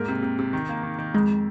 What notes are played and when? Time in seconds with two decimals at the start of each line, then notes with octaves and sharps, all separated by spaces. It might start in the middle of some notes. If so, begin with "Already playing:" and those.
Already playing: G#2 A#3 A#4
0.08 C3
0.22 C3
0.39 C3
0.53 D#3
0.69 A#3
0.83 D#3
0.98 D#3
1.14 F2 G#3